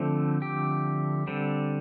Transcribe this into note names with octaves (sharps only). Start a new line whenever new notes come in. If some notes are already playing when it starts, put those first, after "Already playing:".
Already playing: D3 F3 A3 C4
G4
D3 G3 C4